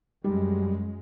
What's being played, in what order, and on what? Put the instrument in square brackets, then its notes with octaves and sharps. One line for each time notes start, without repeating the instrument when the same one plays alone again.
[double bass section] F#2 G#3 [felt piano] G3